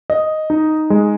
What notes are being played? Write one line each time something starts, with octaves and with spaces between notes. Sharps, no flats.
D#5
D#4
G#3